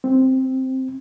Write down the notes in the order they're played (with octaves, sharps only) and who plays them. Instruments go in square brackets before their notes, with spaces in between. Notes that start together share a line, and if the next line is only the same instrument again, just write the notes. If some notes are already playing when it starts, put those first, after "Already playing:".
[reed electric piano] C4